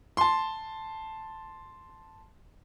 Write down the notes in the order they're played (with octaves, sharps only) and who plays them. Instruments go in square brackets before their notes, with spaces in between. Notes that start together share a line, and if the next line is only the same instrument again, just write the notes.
[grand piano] A5 C6